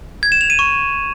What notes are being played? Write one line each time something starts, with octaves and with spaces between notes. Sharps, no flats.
G#6
E7
F7
D#7
C#6